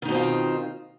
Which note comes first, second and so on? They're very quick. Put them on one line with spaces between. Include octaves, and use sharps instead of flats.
D#3 D#4 B2 C4 F4